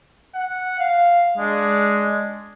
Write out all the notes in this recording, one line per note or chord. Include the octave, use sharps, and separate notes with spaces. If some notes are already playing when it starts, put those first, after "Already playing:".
F#5
F5
G#3 D4